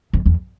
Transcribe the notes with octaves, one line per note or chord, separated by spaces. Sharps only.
F2
E2